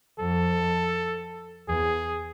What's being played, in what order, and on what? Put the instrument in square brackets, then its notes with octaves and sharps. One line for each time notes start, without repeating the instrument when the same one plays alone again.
[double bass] F2 [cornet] A4
[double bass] E2 [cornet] G#4